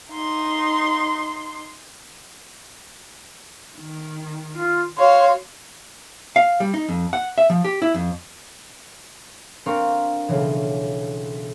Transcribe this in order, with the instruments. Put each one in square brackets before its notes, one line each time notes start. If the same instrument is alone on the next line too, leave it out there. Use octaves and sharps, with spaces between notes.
[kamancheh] D#4 C6
[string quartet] D#3
[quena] F4
[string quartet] F#4 C#5 F5 [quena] C6
[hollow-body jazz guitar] F5
G3
D#4
F2
F#5
E5
F3
G4
E4
F2
[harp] C4 D4 A#4 F5 C6 C#6
B1 C#3 E3